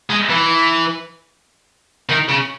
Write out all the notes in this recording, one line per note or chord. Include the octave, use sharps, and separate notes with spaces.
G#3
E3
D#3
C#3